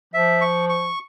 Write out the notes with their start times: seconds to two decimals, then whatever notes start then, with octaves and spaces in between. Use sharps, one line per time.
0.14 F3 E5
0.41 C#6
0.69 C#6